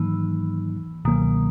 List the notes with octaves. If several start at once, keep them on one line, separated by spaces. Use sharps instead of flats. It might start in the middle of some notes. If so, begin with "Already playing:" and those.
Already playing: G#2 D#3 E3 F#3 A#3 D#4
C#2 B2 D#3 F#3 A#3